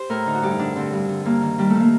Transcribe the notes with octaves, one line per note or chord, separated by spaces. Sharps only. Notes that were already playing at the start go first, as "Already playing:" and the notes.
Already playing: G4 C5
A2 A#4
D3 D#4
F#4
G2 G4
D#4
D3 D4
D3 C4
G2
D3
G2 A#3
D#3
D#3 G3
A3
D#3
A#3